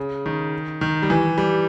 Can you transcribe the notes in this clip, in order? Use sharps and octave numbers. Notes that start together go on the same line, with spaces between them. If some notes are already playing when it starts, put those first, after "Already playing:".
Already playing: C#3
D#3
D#3
G3
E3
G3